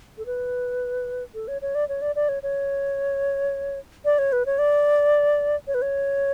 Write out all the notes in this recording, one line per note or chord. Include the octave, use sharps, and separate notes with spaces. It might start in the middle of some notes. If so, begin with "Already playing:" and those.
A4
B4
A4
C#5
C#5
D5
C#5
D5
D5
C#5
C#5
D5
C#5
B4
C#5
D5
C#5
B4
C#5